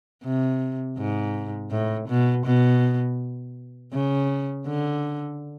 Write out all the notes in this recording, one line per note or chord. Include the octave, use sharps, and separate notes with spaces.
C3
G#2
A2
B2
B2
C#3
D3